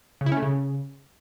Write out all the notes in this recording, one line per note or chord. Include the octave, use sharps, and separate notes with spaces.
C#3
E4
C#4
A3
C#3